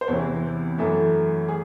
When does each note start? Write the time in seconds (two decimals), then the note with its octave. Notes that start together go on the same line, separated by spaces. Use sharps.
0.01 C5
0.08 E2 C3 E3 C#5
0.78 F#2 E3 A3 A4
1.49 G#4